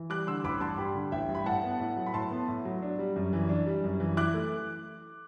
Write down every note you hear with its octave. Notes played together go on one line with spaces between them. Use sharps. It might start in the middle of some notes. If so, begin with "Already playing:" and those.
Already playing: E3
G3 D6 F#6
D3 C6 E6
A1 B5 D6
G2 A5 C6
G3 G5 B5
D3
A1 E5 G5
G2
B5
A2 F#5 A5
B3
A2
F#3
B5
A2 A5 C6
B3
A2
F#3
D4
G3
F#2
E3
D4
G3
F#2
E3
E4 D6 F#6
A3